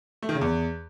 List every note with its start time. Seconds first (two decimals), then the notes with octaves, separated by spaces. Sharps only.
0.22 A3
0.29 D#3
0.35 C#3
0.41 E2